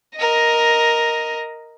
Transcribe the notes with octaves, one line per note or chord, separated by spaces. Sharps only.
A#4 D#5